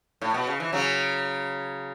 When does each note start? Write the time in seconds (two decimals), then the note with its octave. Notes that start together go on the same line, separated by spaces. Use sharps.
0.21 A2
0.34 B2
0.47 C#3
0.60 E3
0.73 C#3 F#3